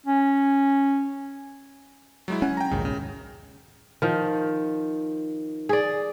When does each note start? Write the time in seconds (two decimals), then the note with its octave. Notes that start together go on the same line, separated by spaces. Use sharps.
0.07 C#4
2.28 F#3 G#3 E4
2.42 C#4 F#5 G#5
2.57 G5 A#5
2.71 A#1 D#2 G#2 C#3
2.85 C#3
4.02 D#3 F3
5.69 G#4 D5